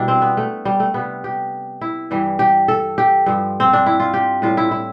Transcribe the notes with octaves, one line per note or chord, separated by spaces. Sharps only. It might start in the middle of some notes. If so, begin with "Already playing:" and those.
Already playing: B2 G3 D4 E4
C4
B3
A3
G3
A3
C3 G3 B3
G4
E4
G2 E3 G3
G4
A4
G4
G2 F3
C4
D4
E4
F4
G4
A2 G3 F4
E4
E4